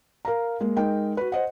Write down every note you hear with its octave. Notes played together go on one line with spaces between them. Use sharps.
A#4 F5 A#5
G#3 A#3
G#3 D#4 A#4 G5
F#4 B4
C5 D#5 F#5